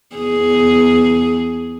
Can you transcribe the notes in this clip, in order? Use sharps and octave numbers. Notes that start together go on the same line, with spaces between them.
E2 G#4